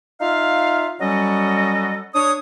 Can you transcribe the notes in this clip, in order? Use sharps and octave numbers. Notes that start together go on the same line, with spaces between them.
D#4 F4 E5 F5
F#3 G3 C#4 F#4 A4 D#5
D4 C#5 D#6